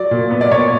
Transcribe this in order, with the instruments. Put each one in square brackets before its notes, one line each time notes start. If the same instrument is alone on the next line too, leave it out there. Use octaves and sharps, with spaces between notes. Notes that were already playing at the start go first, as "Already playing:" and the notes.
Already playing: [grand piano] F#3 D5
A#2
B3
D5
A#2 C#5